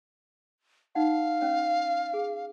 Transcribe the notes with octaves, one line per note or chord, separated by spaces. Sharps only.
D#4 F5 F#5
C#4 C#5
G#4